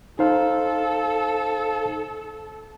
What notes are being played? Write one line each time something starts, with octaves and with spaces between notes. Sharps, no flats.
D#4 A4 C5 F5